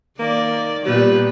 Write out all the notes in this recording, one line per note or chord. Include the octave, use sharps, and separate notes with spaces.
D#3 A#3 D5
A#2 G3 B3 B4